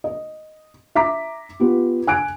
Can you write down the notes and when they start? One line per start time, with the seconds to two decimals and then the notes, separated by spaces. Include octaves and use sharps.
0.04 D#5
0.95 E5 A#5 D6 B6
1.60 B3 F4 G4
2.07 G#5 F#6 D7